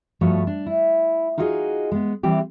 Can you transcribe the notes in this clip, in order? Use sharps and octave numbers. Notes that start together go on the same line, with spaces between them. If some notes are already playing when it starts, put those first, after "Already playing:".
G2 F3 A3 F#4 B4 C#5
D4
E4
D#4 F4 F#4 G#4 D#5
G#3 B3
E3 G3 C4 G4